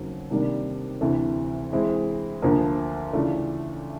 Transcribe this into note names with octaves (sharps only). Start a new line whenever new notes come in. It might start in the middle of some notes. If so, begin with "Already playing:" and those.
Already playing: D#2 C#3 F#3 A3 C4
C3 D#3 G3 A#3 D4
D2 C3 E3 A3
E3 G#3 C4 E4
D2 D3 F3 A#3
C#3 E3 A3 D4 F4